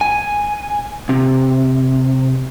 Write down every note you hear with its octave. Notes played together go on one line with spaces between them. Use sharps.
G#5
C3